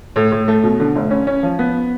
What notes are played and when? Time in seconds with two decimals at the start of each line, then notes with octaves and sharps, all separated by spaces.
0.16 A2
0.32 A2
0.48 A3
0.64 B2
0.80 D3
0.95 F1
1.11 C#4
1.27 C#4
1.43 F3
1.59 B3